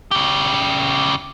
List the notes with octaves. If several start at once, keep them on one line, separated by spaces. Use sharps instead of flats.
C#3 G4